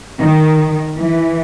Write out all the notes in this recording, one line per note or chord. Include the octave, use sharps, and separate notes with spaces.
D#3
E3